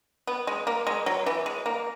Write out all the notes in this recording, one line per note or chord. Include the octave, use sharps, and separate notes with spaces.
B3
G#3
A#3
G#3
F#3
E3
G#3
A#3